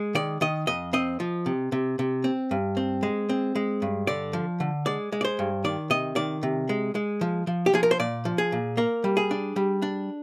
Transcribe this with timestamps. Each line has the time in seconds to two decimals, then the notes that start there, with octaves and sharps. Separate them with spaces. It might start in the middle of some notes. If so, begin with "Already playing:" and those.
Already playing: G#3
0.15 D#3 D5
0.41 D#3 D#5
0.67 F2 D#5
0.93 C4 D#5
1.20 F3
1.46 C3
1.72 C3
1.99 C3
2.24 C4
2.51 G2
2.77 C4
3.03 G#3
3.29 C4
3.55 G#3
3.82 G2
4.07 D3 D5
4.33 F3
4.60 D3
4.86 G#3 D5
5.12 G#3
5.21 D5
5.25 C5
5.39 G2
5.64 D#3 D5
5.90 C3 D#5
6.16 D#3 D5
6.43 C3
6.69 G#3
6.95 G#3
7.21 F3
7.47 F3
7.66 G4
7.73 F3 G#4
7.83 A#4
7.91 C5
8.00 A#2 D5
8.25 F3
8.38 G#4
8.52 A#2
8.77 A#3 A#4
9.04 G3
9.17 G#4
9.31 D4
9.56 G3
9.82 D4